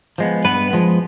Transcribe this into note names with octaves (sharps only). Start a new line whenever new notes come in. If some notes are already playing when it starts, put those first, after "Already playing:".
F3 G#3 B3
G2 B3 B4
F3 G#3 B3